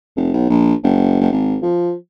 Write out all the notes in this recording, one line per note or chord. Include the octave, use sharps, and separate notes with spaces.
F1
B1
A#1
F#1
F#1
G#1
F3